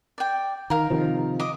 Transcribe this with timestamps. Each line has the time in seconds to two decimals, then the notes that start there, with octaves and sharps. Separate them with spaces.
0.18 D5 G5
0.70 D#3 A#4 F5
0.90 C3 D#3 F3
1.40 D#5 D6